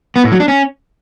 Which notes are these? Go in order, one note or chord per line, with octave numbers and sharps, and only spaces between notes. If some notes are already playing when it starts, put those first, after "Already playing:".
B3
A2
F#3
D4
C#4